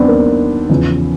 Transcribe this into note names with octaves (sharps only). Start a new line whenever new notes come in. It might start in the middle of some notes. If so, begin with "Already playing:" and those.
Already playing: D#2 D#3 F#3 B3 C4 D4
A#3
E2 C#3 F3